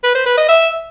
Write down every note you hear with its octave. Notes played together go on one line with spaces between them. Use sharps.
B4
C5
B4
D#5
E5